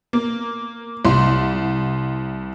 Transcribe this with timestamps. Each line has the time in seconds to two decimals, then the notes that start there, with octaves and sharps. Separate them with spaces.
0.13 A#3
1.05 C2 C6